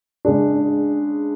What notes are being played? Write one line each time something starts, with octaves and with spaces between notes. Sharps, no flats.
C#3 G#3 D4